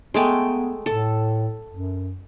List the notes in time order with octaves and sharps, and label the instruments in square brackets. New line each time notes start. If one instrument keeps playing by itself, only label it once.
[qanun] G#3 A3 G5 [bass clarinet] B3
[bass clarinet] A2 [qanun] A4
[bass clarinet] F#2